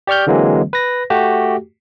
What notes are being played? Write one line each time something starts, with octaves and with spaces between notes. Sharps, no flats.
G4 D5 C#6 F6 G6
D3 E3 F#3 G#3 A#3 C4
B4 A#6
A3 F#4 G4